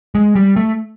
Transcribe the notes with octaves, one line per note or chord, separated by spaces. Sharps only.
G#3
G3
A3